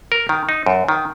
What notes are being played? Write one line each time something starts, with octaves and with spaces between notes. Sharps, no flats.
A#4
D#3
D#4
F#2
D#3